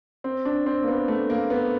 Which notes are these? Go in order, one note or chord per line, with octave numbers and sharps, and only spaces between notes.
C4
D4
C4
A#3
B3
A3
A#3
B3